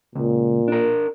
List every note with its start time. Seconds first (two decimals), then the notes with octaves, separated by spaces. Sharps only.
0.15 C#2 A#2
0.68 D4 A#4